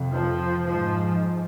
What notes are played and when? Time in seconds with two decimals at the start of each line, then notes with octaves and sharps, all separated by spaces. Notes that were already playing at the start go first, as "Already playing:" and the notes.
Already playing: F2 C3
0.11 F3
0.65 G#2 F3